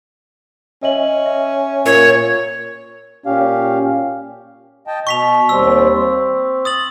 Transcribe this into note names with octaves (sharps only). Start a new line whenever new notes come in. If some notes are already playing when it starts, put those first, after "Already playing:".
C#4 D#5 E5 F#7
E5
A#2 A#4 C#5 C#6
A#2 C#4 G4 F5
D#5 G5 A5
B2 C#6 B6 F7
D#2 G3 C4 E6
C4
D#6 A6 F#7